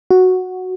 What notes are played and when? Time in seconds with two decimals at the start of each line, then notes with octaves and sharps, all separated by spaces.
0.11 F#4